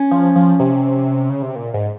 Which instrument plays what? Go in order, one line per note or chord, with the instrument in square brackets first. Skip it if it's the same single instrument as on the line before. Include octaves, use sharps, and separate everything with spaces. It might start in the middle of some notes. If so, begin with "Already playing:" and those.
Already playing: [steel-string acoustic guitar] C#4
[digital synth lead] F3
F3
C3
C#3
C3
A#2
G#2